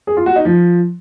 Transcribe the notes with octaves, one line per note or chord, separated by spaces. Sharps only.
G#4
F4
F#4
D#4
F3